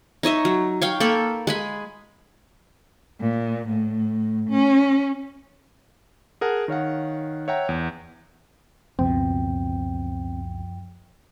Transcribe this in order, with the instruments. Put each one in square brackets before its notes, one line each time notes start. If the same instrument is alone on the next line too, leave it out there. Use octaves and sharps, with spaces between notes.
[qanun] D#4 C#5 D#5 E5
F#3
C#5 F5 G5
A#3 A4 B5
G#3 G#4 B5
[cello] A#2
A2
C#4
[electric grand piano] G#4 A#4 F#5 A5
D#3 C#5 F5 F#5
C#5 E5 F#5 G5 A#5
E2
[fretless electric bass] C#2 B2 [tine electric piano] F#2 F3 G5 [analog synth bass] C4